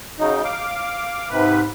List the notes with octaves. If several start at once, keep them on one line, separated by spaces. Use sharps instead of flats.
C#3 F#3 D#4
F5 D6
G#2 C3 B4